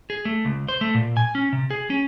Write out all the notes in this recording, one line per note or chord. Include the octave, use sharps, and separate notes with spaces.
G#4
A3
C#2
C5
A3
A#2
G#5
C#4
C3
G#4
C#4